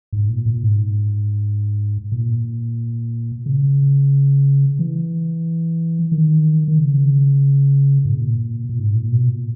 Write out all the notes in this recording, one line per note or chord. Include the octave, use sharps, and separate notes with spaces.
G#2
A#2
A#2
G#2
A#2
C#3
E3
D#3
D#3
C#3
G#2
A#2
A#2
G#2
A#2
B2
A#2